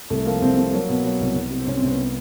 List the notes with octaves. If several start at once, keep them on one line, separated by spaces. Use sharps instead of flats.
C2 A3
F3 A#3
C2 C4
C3 C4
F#3 A#3
B2 B3
F#3
C2
C2
C3
C4
C2 C#4
C4
C2
B3